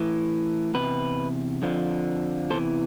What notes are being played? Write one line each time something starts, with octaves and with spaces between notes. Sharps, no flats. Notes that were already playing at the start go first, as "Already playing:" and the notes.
Already playing: A2 E3
E2 C3 B4
F2 D3 F3
E2 C3 E3 A4 C5